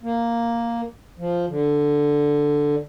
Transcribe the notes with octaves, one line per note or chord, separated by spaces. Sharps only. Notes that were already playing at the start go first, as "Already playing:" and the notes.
A#3
F3
D3